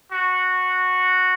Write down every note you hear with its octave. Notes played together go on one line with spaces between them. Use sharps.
F#4